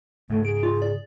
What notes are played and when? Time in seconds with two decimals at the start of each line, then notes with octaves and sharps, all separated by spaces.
0.30 G#2 C#3 A3
0.45 G#4 D7
0.63 F4
0.82 D5